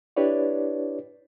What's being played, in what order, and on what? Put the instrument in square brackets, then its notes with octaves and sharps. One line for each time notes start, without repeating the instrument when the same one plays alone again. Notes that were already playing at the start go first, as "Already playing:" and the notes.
[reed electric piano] D4 E4 G4 B4 C#5 D5